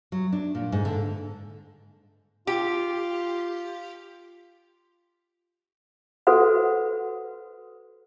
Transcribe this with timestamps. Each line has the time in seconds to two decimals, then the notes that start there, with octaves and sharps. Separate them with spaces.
0.12 F#3
0.33 D4
0.55 A#2
0.72 G#2
0.85 D3
2.47 F4 G4
6.27 F#4 A4 B4 C5 F#5